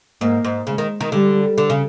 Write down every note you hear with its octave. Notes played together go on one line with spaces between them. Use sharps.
G#2 A#3
G#2
C#3 G#3
D#3
D#3
D3 G3
D3
C#3